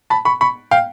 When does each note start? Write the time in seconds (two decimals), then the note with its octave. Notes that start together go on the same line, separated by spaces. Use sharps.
0.10 A5 B5
0.25 B5 C#6
0.41 B5 C#6
0.71 F5 G5